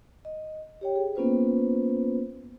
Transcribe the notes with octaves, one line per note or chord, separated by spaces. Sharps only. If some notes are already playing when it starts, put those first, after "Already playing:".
D#5
G4 C#5 G5
G#4
A#3 B3 C#4 F4 B4 C5